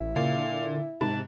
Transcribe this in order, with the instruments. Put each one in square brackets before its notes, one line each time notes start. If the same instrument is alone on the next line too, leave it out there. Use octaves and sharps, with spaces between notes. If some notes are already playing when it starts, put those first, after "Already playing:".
[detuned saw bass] A1 [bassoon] E4
[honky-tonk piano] A#2 [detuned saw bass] C#3 [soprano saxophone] F5
[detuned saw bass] D3
[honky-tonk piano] G#2 [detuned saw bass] C3 [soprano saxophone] A5